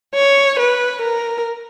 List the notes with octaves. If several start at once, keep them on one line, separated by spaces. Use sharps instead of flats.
C#5
B4
A#4